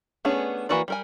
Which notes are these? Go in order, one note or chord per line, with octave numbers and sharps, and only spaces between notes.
A3 B3 C#4 D4 G#4
E3 A#3 F#4 B4 D5
G3 A#4 G#5